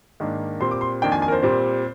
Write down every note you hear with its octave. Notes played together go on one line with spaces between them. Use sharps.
G#2 D#3 A#3 D4
A#2 G3 C4 C6
D6
C6
F2 D#3 A#3 D4 G5
G#5
G#5
A#4
C5
A#2 G3 C4